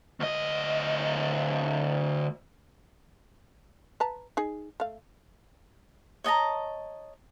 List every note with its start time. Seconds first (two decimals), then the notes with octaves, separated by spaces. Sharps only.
0.20 D2 D#5
4.00 B4 A5 A#5
4.37 D#4 G#4
4.80 A3 F5
6.24 C#5 D#5 A5 A#5